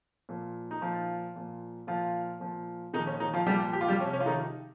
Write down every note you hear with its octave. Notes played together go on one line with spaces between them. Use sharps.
A#2 F3
D#4
A#2 F3 F4
A#2 F3
A#2 F3 F4
A#2 F3
A#2 D#3 F3 D#4
C#4
D#3 D#4
F3 F4
A#2 F3 G3 G4
G4
F4
G3 G4
C3 F3 C#4
C#4
F4
D#3 D#4